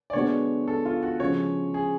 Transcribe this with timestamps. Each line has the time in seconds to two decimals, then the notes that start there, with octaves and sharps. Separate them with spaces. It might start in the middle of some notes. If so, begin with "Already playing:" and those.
0.10 D5
0.13 D3 G#3 B3 D4 F#4 C#5
0.68 A4
0.85 F4
1.03 F#4
1.20 C#3 F3 G#3 C#5
1.74 G#4